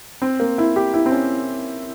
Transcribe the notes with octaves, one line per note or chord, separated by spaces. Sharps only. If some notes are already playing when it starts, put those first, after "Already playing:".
C4
A#3
E4
G4
E4
C4
C#4